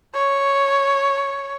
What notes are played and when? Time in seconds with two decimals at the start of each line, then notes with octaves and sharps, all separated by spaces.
0.15 C#5